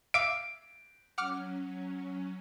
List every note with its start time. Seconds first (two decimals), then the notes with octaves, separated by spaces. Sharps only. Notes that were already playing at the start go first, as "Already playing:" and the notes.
0.14 E5 F5 D6 D7
1.18 F#3 C#4 F#5 D6 F6